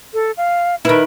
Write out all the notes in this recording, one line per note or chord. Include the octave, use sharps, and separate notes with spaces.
A4
F5
D#3 E4 B4